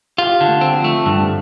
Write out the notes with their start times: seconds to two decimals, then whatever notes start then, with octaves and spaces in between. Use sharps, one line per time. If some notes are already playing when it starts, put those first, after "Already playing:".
0.18 F4 G4
0.41 D3
0.47 A3
0.61 C4
0.77 F3
0.84 A3
1.06 G2 D3